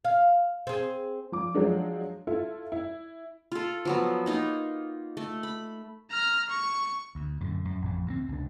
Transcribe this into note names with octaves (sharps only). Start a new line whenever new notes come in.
F5
C4 G#4
F3 D6
F3 F#3 G#3 D4
E4 F4 A4
E4
F4 A4
F3 F#3 B3
A#3 D#4 F4
A3
B5
A#5 F6
C#6
D2
F#2 A2 D3
F#2
A1 F2
D2 D3 C4
C#2 C3 D4